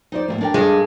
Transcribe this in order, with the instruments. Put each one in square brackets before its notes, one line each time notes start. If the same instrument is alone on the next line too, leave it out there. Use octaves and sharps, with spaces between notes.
[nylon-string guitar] D#4 C5 D5
A2 A3 A#3
D4 A#4 G5
[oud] G2 G#3